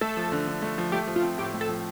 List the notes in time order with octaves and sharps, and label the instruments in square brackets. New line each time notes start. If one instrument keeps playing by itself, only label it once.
[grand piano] A3 [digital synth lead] A4
[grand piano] F3
D3
D3
A3
F3
[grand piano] A3 [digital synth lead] G4
[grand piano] F3
[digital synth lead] F4
[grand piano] C4
[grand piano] A2 [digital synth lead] G4
[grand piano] A3
[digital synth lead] A4
[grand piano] F3